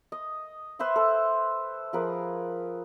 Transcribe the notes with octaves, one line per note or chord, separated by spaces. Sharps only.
D#5
B4 C5 E5 C6
A4
F3 G#4 A#4 B4